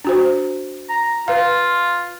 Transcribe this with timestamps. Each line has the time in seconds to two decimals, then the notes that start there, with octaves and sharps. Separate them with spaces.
0.05 D4 F#4 C5
0.89 A#5
1.28 F4 B4 F5